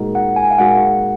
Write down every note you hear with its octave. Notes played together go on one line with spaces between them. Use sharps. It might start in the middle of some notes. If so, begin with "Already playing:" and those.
Already playing: A#2 G#3 D#4 F#4 A#4
F#5
G#5
F5
A#2 G#3 D#4 F#4 A#4 F#5